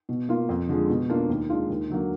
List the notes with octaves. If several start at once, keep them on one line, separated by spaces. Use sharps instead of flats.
B2
A#3 F4
F2
D3 F3 G#3
B2
A#3 D4 F4
D#2
D#3 G#3 D4 F4
D#2
D3 F#3 A#3